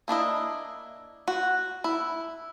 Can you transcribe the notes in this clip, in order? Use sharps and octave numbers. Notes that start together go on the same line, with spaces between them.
A#3 D4 E4 D#5
F#4
E4